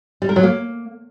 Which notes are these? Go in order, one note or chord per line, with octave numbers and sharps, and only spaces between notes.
G3
A#4
F#3
A#3